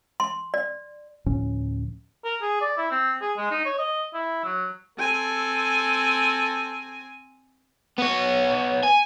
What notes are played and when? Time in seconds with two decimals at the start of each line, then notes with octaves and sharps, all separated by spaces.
0.20 C6
0.54 D5
1.26 D2 A2 F3 C#4
2.24 A#4
2.42 G#4
2.61 D5
2.77 E4
2.91 C4
3.21 G#4
3.37 G#3
3.51 D#4
3.65 C#5
3.79 D#5
4.14 E4
4.44 F#3
4.98 C4 A4 G#5
7.98 B3 C#5
8.83 G#5